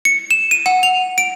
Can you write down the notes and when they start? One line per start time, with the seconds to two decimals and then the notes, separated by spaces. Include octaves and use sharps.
0.05 C#7
0.31 E7
0.51 D#7
0.66 F#5
0.83 F7
1.18 D7